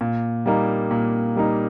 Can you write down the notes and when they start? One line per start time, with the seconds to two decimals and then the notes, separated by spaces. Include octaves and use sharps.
0.01 A#2
0.46 G3 A#3 D#4
0.91 A#2
1.36 G3 A#3 D#4